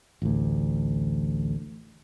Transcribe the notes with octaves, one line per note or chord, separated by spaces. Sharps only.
A1 D2